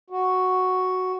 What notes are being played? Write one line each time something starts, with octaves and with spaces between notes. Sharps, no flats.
F#4